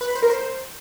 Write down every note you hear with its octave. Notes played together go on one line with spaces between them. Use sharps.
B4
B5
C5
A#4
C5